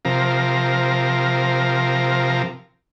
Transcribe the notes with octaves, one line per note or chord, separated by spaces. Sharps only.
C3 F3 A#4